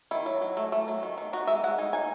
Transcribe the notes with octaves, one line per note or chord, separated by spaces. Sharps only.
D#3 E4
F#3
F#3
A3
A3
F#3
D#3
D#3
D#4 F#4
G#3 E5
G#3 F#5
D#4 G#5
D#4 G#5